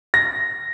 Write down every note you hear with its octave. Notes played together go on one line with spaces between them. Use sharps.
A#6